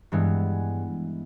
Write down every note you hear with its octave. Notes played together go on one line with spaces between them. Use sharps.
G2 E3 G#3 B3